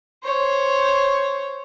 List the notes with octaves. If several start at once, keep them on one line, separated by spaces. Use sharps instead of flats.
C5 C#5